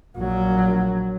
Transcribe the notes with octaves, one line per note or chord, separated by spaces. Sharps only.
A#1 F#3